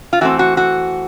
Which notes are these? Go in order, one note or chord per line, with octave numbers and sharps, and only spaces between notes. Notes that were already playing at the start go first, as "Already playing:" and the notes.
F4
E3 A3 C4 F#4
F#4
F#4